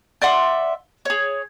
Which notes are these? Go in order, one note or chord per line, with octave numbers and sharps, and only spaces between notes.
D5 E5 F#5 C6
G#4 C#5